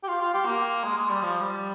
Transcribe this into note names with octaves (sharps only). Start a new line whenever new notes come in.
G4
F4
F4
G4
A#3
G#3
G#3
G3
F3
G3